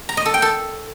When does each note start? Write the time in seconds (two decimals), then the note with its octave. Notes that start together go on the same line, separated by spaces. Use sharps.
0.09 A#5
0.17 D#5
0.26 A4
0.34 G5
0.42 A4